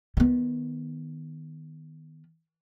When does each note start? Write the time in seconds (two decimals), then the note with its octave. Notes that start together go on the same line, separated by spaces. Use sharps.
0.17 D#3 B3